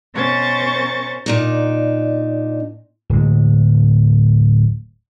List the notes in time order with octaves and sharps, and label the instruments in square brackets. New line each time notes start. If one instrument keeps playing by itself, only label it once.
[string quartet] B2 C#4 A#4 C5 C#6 A6
[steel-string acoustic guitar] A#2 D4 D#4
[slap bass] D1 G#3